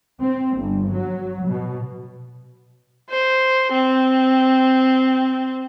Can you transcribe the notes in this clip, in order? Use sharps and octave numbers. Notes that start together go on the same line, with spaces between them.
C4
G1
F#3
B2
C5
C4